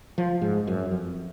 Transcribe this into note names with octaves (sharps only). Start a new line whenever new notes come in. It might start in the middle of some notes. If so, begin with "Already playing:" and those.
F3
G#2
F#2
F2